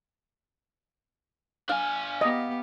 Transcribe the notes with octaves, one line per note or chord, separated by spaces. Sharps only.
D4 F5 G#5
B3 G4 D#5